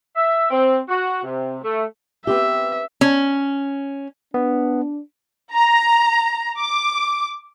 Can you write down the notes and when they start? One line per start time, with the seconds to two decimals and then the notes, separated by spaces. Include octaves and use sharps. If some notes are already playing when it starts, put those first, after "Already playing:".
0.16 E5
0.51 C4
0.89 F#4
1.23 C3
1.63 A3
2.27 B3 C4 G4 E5
3.01 C#4
4.34 B3 D4
5.54 A#5
6.60 D6